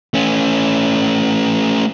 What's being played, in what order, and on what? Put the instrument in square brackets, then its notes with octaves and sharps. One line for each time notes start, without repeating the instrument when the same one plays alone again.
[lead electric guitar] A3 C#4